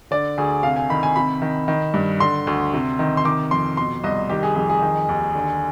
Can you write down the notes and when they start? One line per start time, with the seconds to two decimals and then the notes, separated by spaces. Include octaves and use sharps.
0.11 D3 D5
0.38 D2 G#4
0.63 C3 F5
0.76 G#5
0.90 D#3 B5
1.03 G#5
1.16 C3 B5
1.42 D#3
1.68 D#3
1.94 G2
2.20 D3 C6
2.47 D2
2.73 C3
2.99 D#3
3.17 C6
3.25 D#3 D6
3.51 F2 C6
3.77 B2 C6
4.04 C2 D#5
4.29 D#3 G4
4.43 G#4
4.56 F2 G#4
4.70 G#4
4.82 D#3
5.09 D#2
5.35 D3